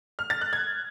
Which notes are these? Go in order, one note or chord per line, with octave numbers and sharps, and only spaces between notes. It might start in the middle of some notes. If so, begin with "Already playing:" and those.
F6
A6
F#6
G#6